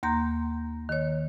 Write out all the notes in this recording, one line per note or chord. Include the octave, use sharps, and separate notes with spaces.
D#2 A#3 A#5 C6 G6 A#6
D#3 C#5